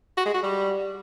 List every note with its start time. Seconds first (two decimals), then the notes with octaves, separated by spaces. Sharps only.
0.17 F#4
0.26 G#3
0.34 F#4
0.43 G3